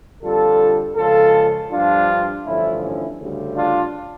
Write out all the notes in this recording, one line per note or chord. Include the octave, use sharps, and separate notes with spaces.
F2 D3 G3 F4 A4
C#2 C#3 F3 F4 A4
G2 F3 D4 F4
A1 G2 D3 F3 C#4 E4
C#4 E4
D2 C#3 G3
D4 F4